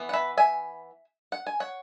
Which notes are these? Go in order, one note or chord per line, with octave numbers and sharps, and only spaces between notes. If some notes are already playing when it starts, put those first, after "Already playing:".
Already playing: E3 B3
F#5
B4 E5
E5 G#5
F#5
G#5
C#5 F#5